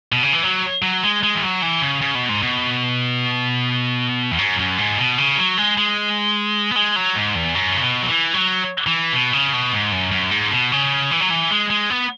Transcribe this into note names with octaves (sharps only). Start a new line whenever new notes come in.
B2
C#3
E3
F#3
F#3
G#3
G#3
E3
F#3
E3
C#3
C#3
B2
G#2
B2
E2
F#2
F#2
G#2
B2
C#3
F#3
G#3
G#3
B3
G#3
F#3
G#2
E2
F#2
C#3
B2
F#3
E3
F#3
E3
B2
C#3
B2
G#2
F#2
F#2
G#2
B2
C#3
E3
F#3
E3
G#3
G#3
B3